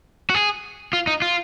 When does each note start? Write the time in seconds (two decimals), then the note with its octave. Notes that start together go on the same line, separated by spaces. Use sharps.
0.30 F#4
0.35 G#4
0.93 F4
1.07 D#4
1.22 F4